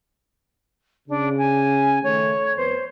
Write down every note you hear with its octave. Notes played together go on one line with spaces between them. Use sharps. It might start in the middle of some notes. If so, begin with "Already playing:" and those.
C#3 D4
G#5
D#3 A3 C#5
F2 B3 B4 C5